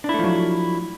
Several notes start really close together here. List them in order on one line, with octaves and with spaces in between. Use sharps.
D4 E4 A3 F3 F#3